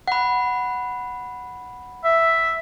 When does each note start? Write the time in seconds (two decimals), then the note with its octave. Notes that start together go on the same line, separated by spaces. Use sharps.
0.08 F#5 B5
2.04 E5